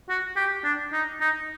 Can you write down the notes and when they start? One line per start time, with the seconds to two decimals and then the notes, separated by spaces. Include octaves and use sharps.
0.09 F#4
0.36 G4
0.64 D4
0.92 D#4
1.20 D#4